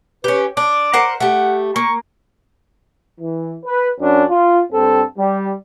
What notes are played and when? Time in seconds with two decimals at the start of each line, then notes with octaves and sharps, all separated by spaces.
0.24 C#4 G4 B4
0.57 D4 D6
0.93 A#4 C5 F#5
1.20 A3 G4 F#5
1.76 A#3 C#6
3.21 E3
3.65 B4
4.00 F#2 C#4 D4
4.30 F4
4.73 G2 C4 A4
5.18 G3